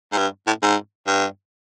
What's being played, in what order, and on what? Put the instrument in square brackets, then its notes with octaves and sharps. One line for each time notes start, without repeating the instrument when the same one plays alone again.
[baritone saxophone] G#2
G2
A2
G#2
G2